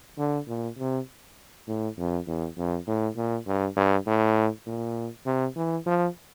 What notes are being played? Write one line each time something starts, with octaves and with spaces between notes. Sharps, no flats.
D3
A#2
C3
A2
F2
E2
F2
A2
A#2
G2
G2
A2
A#2
C3
E3
F3